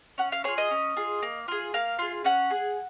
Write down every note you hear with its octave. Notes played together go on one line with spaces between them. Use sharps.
C#4 F#5
F5
F4 G#4 C#5
D#5
C#4
F4 G#4
A#3
F4 G#4
A#3 F5
F4 G#4
C#4 F#5
G#4